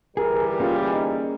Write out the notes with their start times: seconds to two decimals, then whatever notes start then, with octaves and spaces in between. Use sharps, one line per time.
0.17 G1 E3 G3 G#4 A#4
0.60 A#3 C#4 F4 G#4
0.92 D#4